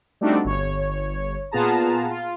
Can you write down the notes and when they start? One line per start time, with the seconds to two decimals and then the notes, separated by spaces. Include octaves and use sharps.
0.21 G3 A3 C4 D4 D#4 F#4
0.45 G1 C#5
1.52 A#2 B3 F4 G#4 A5 A#5
2.10 F4